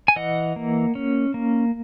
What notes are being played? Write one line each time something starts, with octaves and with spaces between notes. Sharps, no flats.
G#5
E3 D#5 F#5
A#3
C#4
A#3